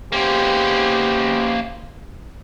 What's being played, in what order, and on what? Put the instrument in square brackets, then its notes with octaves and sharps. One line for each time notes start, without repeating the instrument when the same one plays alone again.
[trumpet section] G#3 B3 C5 [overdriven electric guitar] A#3 C#4 [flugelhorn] G4